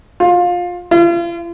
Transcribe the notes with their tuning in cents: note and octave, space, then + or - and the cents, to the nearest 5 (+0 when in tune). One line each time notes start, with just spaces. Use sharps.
F4 +20
F4 -40